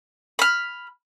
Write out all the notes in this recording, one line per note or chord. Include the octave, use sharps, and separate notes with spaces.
B5 F6